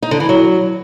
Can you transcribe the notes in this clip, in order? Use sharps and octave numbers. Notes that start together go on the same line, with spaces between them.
D#4
D3
E3
F#3